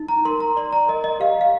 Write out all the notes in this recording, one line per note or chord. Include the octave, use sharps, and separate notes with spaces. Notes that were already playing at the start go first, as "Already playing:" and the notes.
Already playing: D#4
A#5
A#4 C6
A#5
D5 C6
A#5
A#4 D#5
D#5
G4 F5
F5